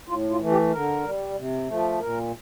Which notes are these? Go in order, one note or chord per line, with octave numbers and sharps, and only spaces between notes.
A2 F4
F4
E3 A3
G4
D3 A#4
G3
C3
F3 A3
A#2 A#4